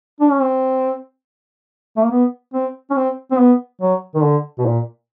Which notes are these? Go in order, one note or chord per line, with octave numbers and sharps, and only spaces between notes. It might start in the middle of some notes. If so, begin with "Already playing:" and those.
D4
C#4
C4
A3
A#3
B3
C4
C#4
C4
C4
B3
F#3
D#3
D3
B2
A#2